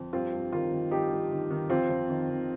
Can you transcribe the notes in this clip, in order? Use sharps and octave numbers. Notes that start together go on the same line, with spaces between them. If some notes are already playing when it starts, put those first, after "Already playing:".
Already playing: F2
G2 C4 F4
G2
D#3 F4 A#4
D#3
G2 D#4 G4
G2
D#3
D#3
F2 C4 F4
F2
D#3
D#3